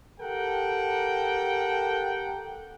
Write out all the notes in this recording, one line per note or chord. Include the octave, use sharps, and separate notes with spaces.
G4 A4 A#4 F#5 G5